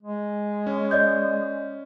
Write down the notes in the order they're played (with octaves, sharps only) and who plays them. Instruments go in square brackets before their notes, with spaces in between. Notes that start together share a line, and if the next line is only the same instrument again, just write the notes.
[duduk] G#3
[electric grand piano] C#4
[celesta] D5 D#5 G6